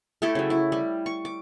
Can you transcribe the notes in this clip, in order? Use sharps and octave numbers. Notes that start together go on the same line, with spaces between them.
A3 E4 G4 A4
C#3 F#3
E4
G3
C#6
D6